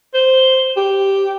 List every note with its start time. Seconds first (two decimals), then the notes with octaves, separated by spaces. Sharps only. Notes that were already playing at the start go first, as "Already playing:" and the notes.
0.14 C5
0.77 G4